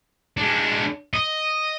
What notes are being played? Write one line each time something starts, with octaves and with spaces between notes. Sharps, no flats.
G#3 D4
D#5